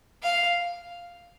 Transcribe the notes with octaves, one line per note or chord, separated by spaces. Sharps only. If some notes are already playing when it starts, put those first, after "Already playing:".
F5